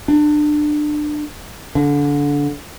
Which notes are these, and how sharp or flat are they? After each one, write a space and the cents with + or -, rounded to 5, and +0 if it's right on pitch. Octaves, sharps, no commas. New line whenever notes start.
D4 +25
D3 -25